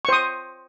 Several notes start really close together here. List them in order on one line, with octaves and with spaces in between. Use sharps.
C#6 C5 D#6